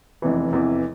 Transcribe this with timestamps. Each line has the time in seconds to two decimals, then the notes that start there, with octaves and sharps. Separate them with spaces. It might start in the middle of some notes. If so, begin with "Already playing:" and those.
0.22 F1 E2 C3 E3
0.51 F1 E2 C3 E3